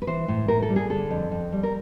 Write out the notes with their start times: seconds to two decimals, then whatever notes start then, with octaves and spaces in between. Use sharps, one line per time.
0.02 B4
0.07 E3 C5
0.28 A2
0.48 A2 A#4
0.62 A4
0.69 G3
0.76 G#4
0.90 D3 A4
1.11 F2
1.31 F2
1.52 G3
1.63 A#4